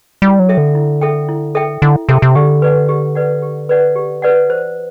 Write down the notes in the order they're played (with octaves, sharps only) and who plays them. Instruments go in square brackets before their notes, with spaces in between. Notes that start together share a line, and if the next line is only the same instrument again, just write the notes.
[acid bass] G3 [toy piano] E4
[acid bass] F#3
[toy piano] A4 E5 G5
[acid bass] D3
[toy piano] E4
A4 E5 G5
E4
A4 E5 G5
[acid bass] D3 [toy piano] E4
[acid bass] C3 [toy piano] A4 E5 G5
[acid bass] C3
[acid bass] D3 [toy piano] G4
[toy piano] B4 D5 F#5
G4
B4 D5 F#5
G4
B4 D5 F#5
G4
B4 D5 F#5
[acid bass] E3 [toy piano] C5